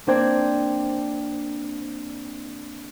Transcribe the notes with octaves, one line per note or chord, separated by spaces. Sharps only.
A#3 C4 D4 C5 G5 G#6